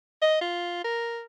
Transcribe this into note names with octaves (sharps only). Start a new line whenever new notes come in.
D#5
F4
A#4